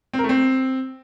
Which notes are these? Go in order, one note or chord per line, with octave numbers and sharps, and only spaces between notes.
C4
A#4
A3
C4